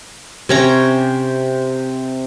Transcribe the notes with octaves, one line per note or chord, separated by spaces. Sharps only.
C3 C#4 A#5